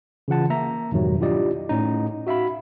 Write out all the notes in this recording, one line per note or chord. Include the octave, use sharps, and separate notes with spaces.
C#3 E3 F4 F#5 A5
A#3 E5 A#5
F2 G#2 B2 D#3 F#3 G3
D4 E4 F4 G4 D5 D#5
A2 C#4 D#4
F#4 E5 F5 B5